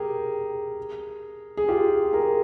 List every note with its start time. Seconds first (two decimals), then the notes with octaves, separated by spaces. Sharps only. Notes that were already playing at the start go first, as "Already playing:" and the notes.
Already playing: G4 G#4 A#4
1.57 G#4
1.68 F4 G4
2.13 G#4 A#4